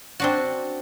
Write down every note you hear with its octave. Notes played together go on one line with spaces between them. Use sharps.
C4 D4 F#4